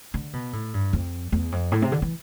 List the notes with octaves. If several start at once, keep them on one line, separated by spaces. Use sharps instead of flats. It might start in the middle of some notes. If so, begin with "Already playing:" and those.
D3
B2
A2
G2
F2
E2
F2
A2
C3
D3
E3